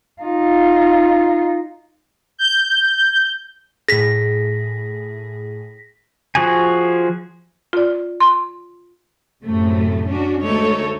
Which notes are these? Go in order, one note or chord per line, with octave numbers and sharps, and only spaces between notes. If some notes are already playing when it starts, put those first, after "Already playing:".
D#4 F4
G6
A2 G#4 A#6 B6
F3 F#4 G#4 G#5
F4 D5
C6
F#2 A2 C3 A3
C#4 D4 F#4
D2 G#3 A3 D#4 A4 C#5